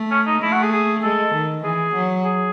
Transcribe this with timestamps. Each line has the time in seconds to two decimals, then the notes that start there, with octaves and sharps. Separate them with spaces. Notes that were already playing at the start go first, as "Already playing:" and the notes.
Already playing: A3
0.11 C#4
0.27 D#4
0.41 A3 E4
0.52 F#4
0.62 G#4
0.73 G#4
1.02 G#3 A4
1.34 D#3
1.63 E3 G#4
1.94 F#3
2.24 G#4